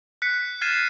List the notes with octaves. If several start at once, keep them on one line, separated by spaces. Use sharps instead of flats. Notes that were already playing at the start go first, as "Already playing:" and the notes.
F#6 B6 C#7
B6
F6 G#6 A6 C7 D#7 E7